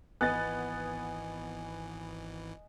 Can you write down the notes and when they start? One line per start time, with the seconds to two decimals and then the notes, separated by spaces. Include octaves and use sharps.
0.21 G#1 E3 B3 D#5 G#5 F#6 A6